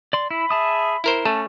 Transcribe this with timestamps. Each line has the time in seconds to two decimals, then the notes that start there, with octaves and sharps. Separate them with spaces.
0.13 D5 C6
0.31 E4 B5
0.51 G#4 E5 A5 D#6
1.04 E4 A#4 C5
1.26 A3 C#4 A5